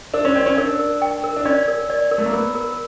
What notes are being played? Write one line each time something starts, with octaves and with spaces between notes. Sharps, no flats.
D4 A#4
C#4
C4 D5
C#4
D4 A#4
A#4
G5
A#4
D4
C#4 D5
A#4
D5
A#4
A3
A#3
B3 A#4
A#4